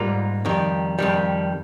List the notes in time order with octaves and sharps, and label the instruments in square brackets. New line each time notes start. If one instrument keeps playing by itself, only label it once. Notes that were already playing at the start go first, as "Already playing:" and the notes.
Already playing: [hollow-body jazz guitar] G#2 G3 A#3 F4
F2 D#3 G3
F2 D#3 G3